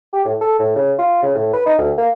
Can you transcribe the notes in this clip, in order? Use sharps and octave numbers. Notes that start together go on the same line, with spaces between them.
G4
A2
A4
A2
C#3
F4
C#3
A2
B4
D#4
D2
A#3